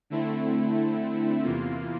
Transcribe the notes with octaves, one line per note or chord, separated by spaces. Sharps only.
D3 A3 C4 E4
E2 C3 E3 A#3 F4